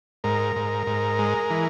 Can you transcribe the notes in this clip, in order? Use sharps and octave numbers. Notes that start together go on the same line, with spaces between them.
G#2 A#4
G#2
G#2
G#3
E3